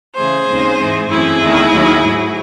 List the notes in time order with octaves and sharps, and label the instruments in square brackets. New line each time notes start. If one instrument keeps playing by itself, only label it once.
[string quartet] C#3 E3 A3 G#4 C5
D#2 C#3 G#3 C4 D#4
G#2 E3 G#3
F#2 E3 A3 C4 E4 G#4
E2 D#3 A3
D#2 D#3 F#3
G#2 F#3 A3